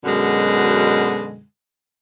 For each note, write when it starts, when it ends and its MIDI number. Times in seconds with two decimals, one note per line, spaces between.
0.05 1.43 42
0.05 1.43 47
0.05 1.43 50
0.05 1.43 56